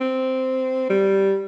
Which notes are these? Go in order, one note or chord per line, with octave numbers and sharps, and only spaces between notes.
C4
G3